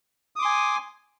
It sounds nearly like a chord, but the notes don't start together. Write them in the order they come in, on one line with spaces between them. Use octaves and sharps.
D#6 D6 C6 G#5